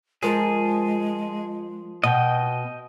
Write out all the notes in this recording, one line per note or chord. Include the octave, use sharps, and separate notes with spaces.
F3 G#3 G#4 A#4
B2 D#5 G5